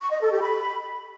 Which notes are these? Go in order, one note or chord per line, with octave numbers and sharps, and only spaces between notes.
C#6
D#5
A4
G4
B5